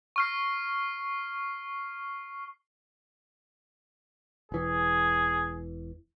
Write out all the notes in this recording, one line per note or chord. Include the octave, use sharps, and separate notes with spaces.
C#6 F6 C7
E1 E3 G#4